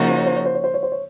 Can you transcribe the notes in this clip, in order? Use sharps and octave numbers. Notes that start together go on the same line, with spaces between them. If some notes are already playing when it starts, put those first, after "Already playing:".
Already playing: C#3 F3 A#3 D#4 F#4
C5
C#5
C5
C#5
C5
C#5
C5
C#5
C5
C#5